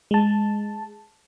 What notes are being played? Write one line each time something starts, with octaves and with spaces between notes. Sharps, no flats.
G#3 A5